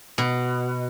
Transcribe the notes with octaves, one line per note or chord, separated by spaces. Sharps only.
B2